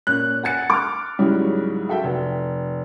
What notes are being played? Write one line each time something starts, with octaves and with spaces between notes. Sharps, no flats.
A#2 C#4 F#6
F#5 G#5 A6 C#7
D6 F6
G#2 C#3 F#3 G3 C#4 E4
F#4 A4 E5 G5
F1